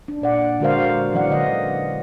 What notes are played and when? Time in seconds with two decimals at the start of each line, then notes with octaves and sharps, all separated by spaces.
0.08 D4
0.22 A#2 D5 F#5
0.60 D3 G#3 F#4 A#4 C5 F5
1.12 E3 F#3 C#4 D5 F#5
1.30 D3 D#5